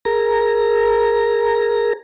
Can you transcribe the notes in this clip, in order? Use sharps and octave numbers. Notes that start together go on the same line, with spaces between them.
G#4 A#4 A#5